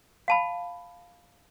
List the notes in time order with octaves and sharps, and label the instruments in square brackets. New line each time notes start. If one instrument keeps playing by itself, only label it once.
[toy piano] F5 A5 B5